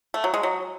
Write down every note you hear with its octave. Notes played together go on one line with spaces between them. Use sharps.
A3
F#3
G#3
F#3